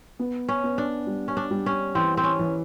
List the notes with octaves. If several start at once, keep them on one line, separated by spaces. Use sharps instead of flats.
B3
C#4
B3
D4
G3
C#4
D4
G3
C#4
E3 C4
C4
C#4
E3